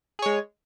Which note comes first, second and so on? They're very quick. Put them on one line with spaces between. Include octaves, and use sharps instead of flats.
G#4 C#5 G#3